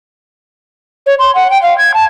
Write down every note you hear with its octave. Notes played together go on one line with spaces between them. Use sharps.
C#5
C6
F#5
G5
F5
G#6
A5